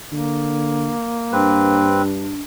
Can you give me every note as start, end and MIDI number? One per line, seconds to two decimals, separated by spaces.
0.12 0.93 50
0.12 2.03 58
1.33 2.33 43
1.33 2.02 60
1.33 2.41 62
1.33 2.02 71